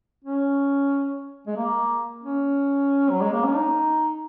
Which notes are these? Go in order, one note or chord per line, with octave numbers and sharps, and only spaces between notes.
C#4
G#3
A#3
C#4
F#3
G#3
A#3
C#4
D#4